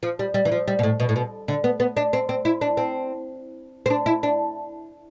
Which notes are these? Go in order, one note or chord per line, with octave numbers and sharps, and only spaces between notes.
F3
G3
G3
E3
F3
G3
B2
A2
B2
A2
B2
D3
B3
B3
D4
C4
C4
E4
D4
C4
C4
D4
E4
D4